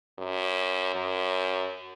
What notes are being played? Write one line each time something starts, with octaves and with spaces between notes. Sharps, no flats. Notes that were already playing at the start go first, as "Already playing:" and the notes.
F#2
F#2